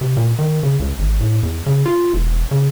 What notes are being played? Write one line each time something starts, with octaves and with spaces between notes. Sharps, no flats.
C3
A#2
D#3
C#3
C#2
G#1
A2
E2
C#3
F4
E1
C#3